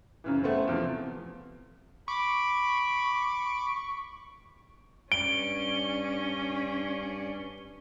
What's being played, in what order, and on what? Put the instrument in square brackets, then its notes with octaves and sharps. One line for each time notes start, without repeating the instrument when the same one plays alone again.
[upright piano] F#2 C#3 E3
A3 B3 C4
E2 C3 F3
[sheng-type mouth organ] B5 [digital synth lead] C#6 [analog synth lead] D6
[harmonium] G2 D5 [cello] C#4 D4 [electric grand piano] D7 [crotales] G7